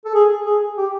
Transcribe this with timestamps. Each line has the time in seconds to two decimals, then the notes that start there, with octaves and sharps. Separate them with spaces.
0.05 A4
0.14 G#4
0.46 G#4
0.78 G4